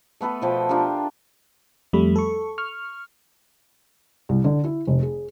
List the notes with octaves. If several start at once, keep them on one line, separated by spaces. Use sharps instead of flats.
A3 B3 A4 B4
B2 F3 G5
D4 F4 G4 A#4
F2 G3 A3 B5
A4 C#6
C#6 F6
C2
D3
E4
F1
G#4